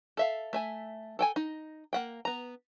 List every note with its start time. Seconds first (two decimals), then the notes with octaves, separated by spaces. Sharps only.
0.17 A4 E5 F5
0.53 A3 E5 G#5
1.19 A4 G5 G#5
1.36 D#4
1.93 A#3 F#5 G5
2.25 B3 A#5